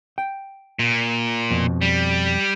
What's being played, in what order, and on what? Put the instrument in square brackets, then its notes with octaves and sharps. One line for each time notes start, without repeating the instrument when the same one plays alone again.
[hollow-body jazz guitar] G5
[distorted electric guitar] A#2
[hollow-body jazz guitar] F2 B2
[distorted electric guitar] G3